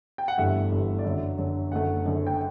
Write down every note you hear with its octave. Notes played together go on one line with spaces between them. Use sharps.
G5
F#5
G1 G2 E3 A3 E5
G1 G2 E3 A3
D5
F#2 D3 F#3 E5
F#2 D3 F#3
F#1 F#2 D3 A3 F#5
F#1 F#2 D3 A3
G5